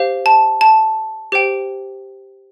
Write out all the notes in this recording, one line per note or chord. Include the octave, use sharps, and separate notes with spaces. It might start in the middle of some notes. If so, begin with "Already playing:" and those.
Already playing: G4 C5 F5
A5
A5
G4 C5 G5